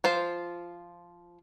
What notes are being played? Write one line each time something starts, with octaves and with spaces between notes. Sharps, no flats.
F3 F4 C5